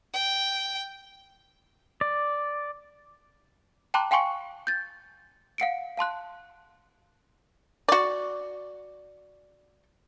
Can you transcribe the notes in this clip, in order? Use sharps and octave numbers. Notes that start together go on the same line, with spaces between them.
G5
D5
G5 A5 A#5 C6 D6 F#6
F5 G5 G#5 C6 C#6 C#7
G6 A6
F5 F#5 C#7 D7
F5 A5 C6 F#6
F#4 D5